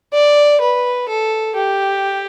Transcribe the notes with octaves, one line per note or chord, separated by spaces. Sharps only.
D5
B4
A4
G4